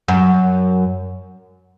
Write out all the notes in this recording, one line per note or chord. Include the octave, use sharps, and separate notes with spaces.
F#2